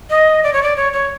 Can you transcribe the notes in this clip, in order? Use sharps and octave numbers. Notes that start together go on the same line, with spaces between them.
D#5
D5
C#5
D5
C#5
C#5